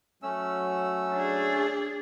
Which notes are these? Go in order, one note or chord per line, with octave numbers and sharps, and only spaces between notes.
F#3 A3 C#4 E6
D4 G#4